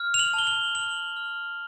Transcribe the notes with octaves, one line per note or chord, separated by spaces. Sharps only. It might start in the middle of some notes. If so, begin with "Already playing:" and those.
Already playing: F6
F7
F#7
A5 G7
F#7
F6 F#7
F6